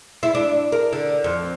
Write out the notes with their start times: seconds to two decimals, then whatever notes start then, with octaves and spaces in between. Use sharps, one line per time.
0.23 E4
0.35 D4
0.72 A#4
0.93 D3
1.24 F2